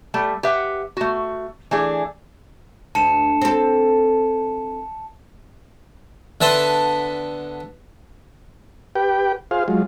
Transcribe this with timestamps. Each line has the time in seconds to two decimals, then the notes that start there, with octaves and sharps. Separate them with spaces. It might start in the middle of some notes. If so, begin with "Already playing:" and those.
0.14 G3 A3
0.43 G4 B4 E5 F#5
0.97 A3 F#4
1.71 E3 A3 D4 G#4
2.95 D2 A5 C#7 E7
3.41 C4 A4
6.41 D3 B3 E5 A5 C6
8.95 G4 B4 G5
9.51 F4 G#4 C5 F5
9.68 F#3 G#3 F4